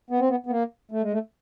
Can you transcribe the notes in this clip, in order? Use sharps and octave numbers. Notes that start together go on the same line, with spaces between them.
B3
C4
B3
B3
A#3
A3
G#3
A3